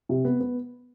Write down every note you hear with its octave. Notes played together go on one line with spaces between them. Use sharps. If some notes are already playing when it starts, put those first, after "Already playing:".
C3
B3
B3